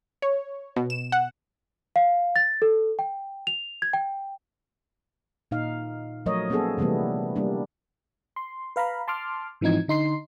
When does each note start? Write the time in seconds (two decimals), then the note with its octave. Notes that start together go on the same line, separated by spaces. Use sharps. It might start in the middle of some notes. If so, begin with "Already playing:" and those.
0.22 C#5
0.76 B2
0.90 E7
1.12 F#5
1.96 F5
2.36 A6
2.62 A4
2.99 G5
3.47 F7
3.82 G#6
3.94 G5
5.51 A#2 D#4 F5
6.26 F3 F#3 A3 A#4 C#5 D#5
6.50 A#3 B3 C#4 F#4 G#4 A4
6.78 C3 E3 G3 A3 B3
7.36 G3 A#3 D4
8.36 C6
8.76 B4 F5 A#5 B5
9.08 A5 C6 D6 F6
9.61 G#2 E3 F3 C4 D#4 G#6
9.88 D3 D#4 C6 C7